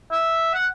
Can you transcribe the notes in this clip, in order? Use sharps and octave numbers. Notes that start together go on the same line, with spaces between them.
E5
F#5